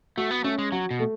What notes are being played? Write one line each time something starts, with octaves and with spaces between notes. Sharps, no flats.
A3 F#4
B3
A3 C#4
G#3
F#3 F#4
B2
A3